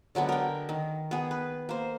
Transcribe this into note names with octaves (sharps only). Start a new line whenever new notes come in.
D3 F#3 G#3 B3
A#4 G5
D#3
B3 G#4
B4
A#3 C5